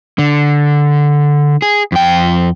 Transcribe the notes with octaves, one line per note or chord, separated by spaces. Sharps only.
D3
G#4
F2 G5